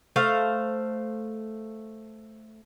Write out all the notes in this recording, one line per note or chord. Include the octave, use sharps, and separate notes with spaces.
A3 C5 F5